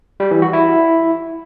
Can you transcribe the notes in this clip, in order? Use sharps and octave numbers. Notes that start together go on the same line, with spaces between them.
G3
E3
F#4
E4